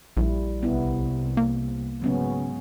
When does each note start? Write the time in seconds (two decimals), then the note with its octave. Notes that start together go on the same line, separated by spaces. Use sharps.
0.17 A#1 G3 E4
0.63 C2 B3 E4
1.37 A#3
2.02 G#2 C#3 F#3 B3 C#4